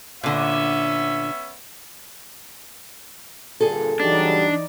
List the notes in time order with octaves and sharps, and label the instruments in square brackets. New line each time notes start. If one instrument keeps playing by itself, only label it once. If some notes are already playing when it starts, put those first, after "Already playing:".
[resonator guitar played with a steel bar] A#2 D3 [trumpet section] B3 C#4 E5
[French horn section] G2 A#2 D3 [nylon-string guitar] G#4 A4
[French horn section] C#3 F#3 G3 [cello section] E3 D#4 D5 [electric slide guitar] D4